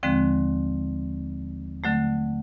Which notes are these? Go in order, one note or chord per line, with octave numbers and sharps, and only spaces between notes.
D#2 D3 F3 G#3 C4
D3 F#3 A3